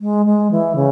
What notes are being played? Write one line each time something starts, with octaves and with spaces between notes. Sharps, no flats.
G#3
G#3
E3
C#3